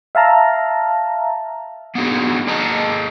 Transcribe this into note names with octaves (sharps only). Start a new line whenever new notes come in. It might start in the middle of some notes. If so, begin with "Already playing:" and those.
E5 F5 A5 A#5
A#3 B3 D4 D#4 F#4 G#4
A#3 G#4 D#5 A5 A#5